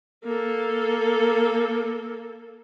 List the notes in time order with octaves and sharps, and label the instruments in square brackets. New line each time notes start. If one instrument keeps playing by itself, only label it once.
[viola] A#3 A4